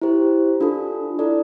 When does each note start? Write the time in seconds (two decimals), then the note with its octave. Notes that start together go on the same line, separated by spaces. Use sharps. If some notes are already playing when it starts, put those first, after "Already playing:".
0.02 E4 G4 C5
0.61 D4 F4 A4
1.19 E4 A4 D5